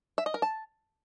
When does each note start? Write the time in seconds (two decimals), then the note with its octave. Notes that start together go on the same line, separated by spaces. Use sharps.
0.18 E5
0.26 D#5
0.34 A#4
0.42 A5